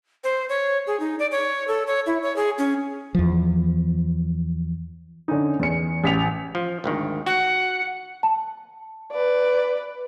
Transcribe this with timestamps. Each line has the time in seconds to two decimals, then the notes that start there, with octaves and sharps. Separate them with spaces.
0.24 C5
0.49 C#5
0.87 G#4
1.00 D#4
1.19 D5
1.31 C#5
1.68 A4
1.87 C#5
2.06 E4
2.22 C#5
2.36 G#4
2.58 C#4
3.15 E2 F3
5.28 D3 C#4 D#4
5.60 E2 C#7
6.04 A1 B6 F7
6.55 F3
6.84 G#1 D2 D#3
7.26 F#4 F#5
8.23 A5
9.12 B4 D5